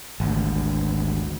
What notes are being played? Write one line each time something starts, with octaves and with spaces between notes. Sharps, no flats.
G#1 D2